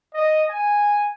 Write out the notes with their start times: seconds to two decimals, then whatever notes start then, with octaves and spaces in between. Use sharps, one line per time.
0.14 D#5
0.50 G#5